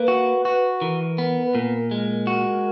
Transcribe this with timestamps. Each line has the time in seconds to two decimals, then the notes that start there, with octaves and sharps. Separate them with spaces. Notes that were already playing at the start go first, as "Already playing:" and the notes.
Already playing: A#3 B4
0.08 F#4
0.45 F#4
0.73 B4
0.81 E3 A#4
1.18 B3
1.43 B4
1.54 A#2 A#4
1.91 G#3
2.27 F#4